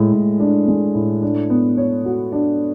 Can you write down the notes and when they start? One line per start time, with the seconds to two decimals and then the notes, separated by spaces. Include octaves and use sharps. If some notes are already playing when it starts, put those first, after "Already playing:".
Already playing: A2 G#3
0.13 A2
0.40 D4
0.68 G#3
0.95 A2
1.22 D4
1.50 B3
1.78 C#5
2.05 F#4
2.32 D4